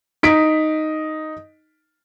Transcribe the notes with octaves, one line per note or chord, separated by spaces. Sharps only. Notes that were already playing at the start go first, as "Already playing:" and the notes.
D#4 B6 D7